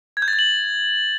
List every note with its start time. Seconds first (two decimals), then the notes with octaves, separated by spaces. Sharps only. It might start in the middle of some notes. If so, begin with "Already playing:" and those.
0.17 G#6
0.22 G6
0.28 A6
0.33 G6
0.39 F#7